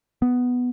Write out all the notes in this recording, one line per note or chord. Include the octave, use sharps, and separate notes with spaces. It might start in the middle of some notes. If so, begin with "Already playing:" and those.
B3